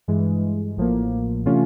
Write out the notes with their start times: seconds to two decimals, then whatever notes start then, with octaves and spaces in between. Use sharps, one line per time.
0.08 G2 E3 G#3
0.77 A1 A2 F3 A#3
1.46 C3 E3 A3 C#4 F4